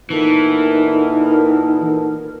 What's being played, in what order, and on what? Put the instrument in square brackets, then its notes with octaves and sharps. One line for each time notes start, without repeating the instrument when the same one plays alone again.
[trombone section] A#2 B3 A4 [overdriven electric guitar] E3 [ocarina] D#4 [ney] A#4